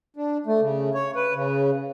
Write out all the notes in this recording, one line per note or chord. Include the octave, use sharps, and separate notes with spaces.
D4
A3
C#3
C#5
B4
C#3